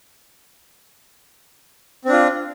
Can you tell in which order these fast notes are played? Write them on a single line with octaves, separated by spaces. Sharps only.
C4 D4 F4